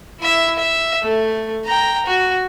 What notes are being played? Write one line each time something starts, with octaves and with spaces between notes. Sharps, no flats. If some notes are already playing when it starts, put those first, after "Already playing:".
E4 E5
E5
A3
G5 A#5
F#4